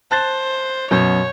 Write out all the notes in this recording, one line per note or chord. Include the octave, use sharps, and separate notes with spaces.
C5 A5 F#6 A6
F#2 B2 C#5 G6